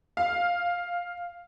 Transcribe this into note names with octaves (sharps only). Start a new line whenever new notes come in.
F5